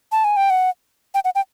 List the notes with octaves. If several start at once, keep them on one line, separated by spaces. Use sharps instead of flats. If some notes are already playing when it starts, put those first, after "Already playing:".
A5
G#5
G5
F#5
G5
F#5
G5